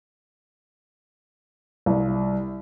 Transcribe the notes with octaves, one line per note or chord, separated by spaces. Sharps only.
C2